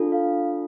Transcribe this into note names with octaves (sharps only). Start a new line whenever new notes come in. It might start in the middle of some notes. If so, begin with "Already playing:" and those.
Already playing: D4 F4 A4
F5